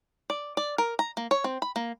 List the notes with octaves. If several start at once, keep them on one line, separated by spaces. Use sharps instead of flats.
D5
D5
A#4
A#5
A#3
C#5
C4
B5
A#3